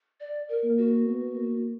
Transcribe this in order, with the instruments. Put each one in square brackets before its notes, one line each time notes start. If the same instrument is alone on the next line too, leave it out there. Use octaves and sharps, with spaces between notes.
[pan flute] D5
A#4
[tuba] A#3
[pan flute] F#4
[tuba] B3
A#3